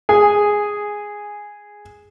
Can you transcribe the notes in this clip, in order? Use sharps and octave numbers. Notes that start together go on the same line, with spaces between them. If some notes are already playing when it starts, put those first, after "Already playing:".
G#4 G#5